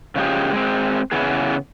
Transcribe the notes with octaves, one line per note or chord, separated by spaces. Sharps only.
C#3 F3 G#3 E4 G4 G#4
G#3 C4
C#3 E3 B3 G#4